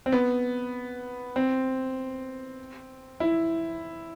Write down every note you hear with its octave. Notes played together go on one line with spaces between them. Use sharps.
C4
B3
C4
E4